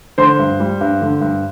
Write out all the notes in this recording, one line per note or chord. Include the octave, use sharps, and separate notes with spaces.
D3 C5 C6
G2
G3
G2
D3
G2